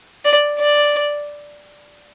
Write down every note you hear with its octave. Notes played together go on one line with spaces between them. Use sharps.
D5
D5